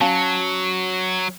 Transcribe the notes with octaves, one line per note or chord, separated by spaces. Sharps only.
F#3 C#4 F5 A5